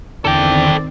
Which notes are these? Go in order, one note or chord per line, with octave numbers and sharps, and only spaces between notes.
E2 D3 D#3 C4 A4 D5 G5